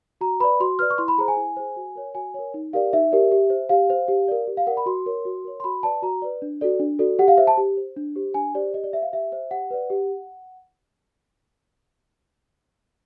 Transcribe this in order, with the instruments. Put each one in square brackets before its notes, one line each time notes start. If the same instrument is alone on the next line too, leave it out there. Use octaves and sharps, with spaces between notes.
[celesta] F#4 A#5
B4 D5 B5
F#4 C6
B4 D5 F6
C#6
E4 C6
B5
G#4 C5 A#5
G#5
E4
G#4 C5
F#4
A#4 C#5
F#4 G#5
A#4 C#5
D#4
G4 A#4 D5 F5
D#4 E5
G4 A#4 D5
G4
C5
G4 F5
C5
G4
A#4 D5
G4
F5
A#4 D5 F#5
B5
F#4 C6
A#4 C#5
F#4
A#4 C#5
C6
F#4 B5
B4 D5 A5
F#4 A#5
B4 D5
D4
F#4 A4 D5
D4
F#4 A4 D5
G4 F#5
F5
C5 E5
A5
G4
C5
D4
G4 C5
D4 G#5
G4 C5 D5
G4 D#5
D5
C5 E5
F5
G4 E5
C5 E5
G4 F#5
B4 D5
G4